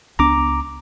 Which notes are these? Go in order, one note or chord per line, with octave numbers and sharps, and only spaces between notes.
C#2 B3 D4 A#5 D6